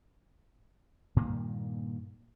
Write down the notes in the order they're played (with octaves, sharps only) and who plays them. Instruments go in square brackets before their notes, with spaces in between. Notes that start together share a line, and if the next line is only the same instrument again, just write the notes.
[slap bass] G2 A#2 D#3 A#3